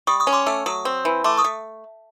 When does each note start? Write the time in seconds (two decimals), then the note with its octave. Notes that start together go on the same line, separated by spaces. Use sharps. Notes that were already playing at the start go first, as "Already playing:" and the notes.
0.07 G3 C#6 D#6
0.20 C#6 D#6
0.27 C#4
0.33 C6 D6
0.46 A3 D6 E6
0.66 F#3 C#6 D#6
0.85 C4
1.05 E3
1.24 A3 C6 D6
1.37 C#6 D#6
1.44 A3